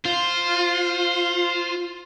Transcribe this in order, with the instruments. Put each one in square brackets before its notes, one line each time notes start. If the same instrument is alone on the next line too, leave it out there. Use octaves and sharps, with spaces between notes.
[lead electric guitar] F4 [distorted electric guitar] C5